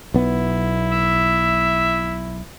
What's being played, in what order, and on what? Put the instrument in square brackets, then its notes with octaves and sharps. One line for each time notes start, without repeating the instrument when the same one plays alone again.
[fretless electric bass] B1 B3 [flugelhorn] E4
[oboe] E5